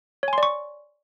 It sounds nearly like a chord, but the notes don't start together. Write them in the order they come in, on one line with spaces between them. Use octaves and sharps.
C#5 G#5 C6 D5 C#6